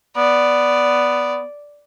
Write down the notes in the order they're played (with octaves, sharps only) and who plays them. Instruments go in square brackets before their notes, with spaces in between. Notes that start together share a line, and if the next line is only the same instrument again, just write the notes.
[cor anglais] B3 [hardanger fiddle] D5